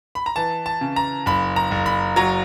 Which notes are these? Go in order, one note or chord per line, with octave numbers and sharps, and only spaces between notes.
B5
A#5
E3 A5
A5
C#3
A#5
F#1 B5
A#5
F#1
B5
F#3 A#5